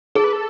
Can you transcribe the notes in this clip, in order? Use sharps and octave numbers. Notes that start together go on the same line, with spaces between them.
G#4 A4
B4
A4